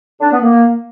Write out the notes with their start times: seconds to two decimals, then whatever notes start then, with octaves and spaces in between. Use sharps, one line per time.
0.21 D4
0.32 B3
0.42 A#3